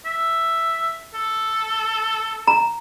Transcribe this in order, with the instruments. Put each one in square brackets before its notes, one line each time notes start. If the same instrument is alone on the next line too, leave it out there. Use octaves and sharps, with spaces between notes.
[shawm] E5
A4
[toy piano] A#5